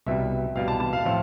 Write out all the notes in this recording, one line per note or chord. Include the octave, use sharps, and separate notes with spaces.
C2 B2 G3 E5
C2 B2 G3 F5
A5
A5
F5
A2 F3 A3 C4 F4 F5